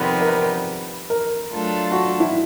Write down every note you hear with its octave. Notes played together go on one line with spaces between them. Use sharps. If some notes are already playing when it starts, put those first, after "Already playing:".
Already playing: F2 C3 D#3 G3 B3 B4
A#4
B4
A#4
F#3 A3 D4 F4 A4
F#4
E4